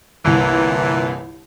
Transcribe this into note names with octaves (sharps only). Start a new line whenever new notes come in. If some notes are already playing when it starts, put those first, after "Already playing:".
G1 C2 A#2 E3